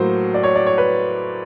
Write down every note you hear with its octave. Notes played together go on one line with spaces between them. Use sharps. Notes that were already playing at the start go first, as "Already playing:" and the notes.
Already playing: A2 F#3 A#3 C5
D5
C#5
D5
C#5
B4